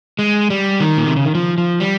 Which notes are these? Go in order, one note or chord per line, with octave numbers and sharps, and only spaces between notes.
G#3
G3
D#3
A#2
C3
C#3
D#3
F3
F3
G3